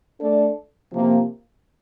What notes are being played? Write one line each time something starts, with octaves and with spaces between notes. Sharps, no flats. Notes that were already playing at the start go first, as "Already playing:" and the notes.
A3 D4 A4 D5
C3 F3 A#3